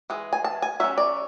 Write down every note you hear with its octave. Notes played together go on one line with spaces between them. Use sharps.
E3 G#3
G#5
A5
G#5
F#3 C#4 E5
D5